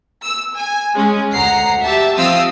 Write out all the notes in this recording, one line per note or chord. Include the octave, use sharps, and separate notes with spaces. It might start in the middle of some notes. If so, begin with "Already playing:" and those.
E6
G#5
G#3 C#4
D2 F#5 A#5 C7
G4 E5 A5
F3 C4 F4 F5 D#6 E6